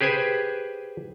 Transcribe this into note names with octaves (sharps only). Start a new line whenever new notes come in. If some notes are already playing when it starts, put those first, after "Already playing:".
G4 G#4 B4 C5 G#5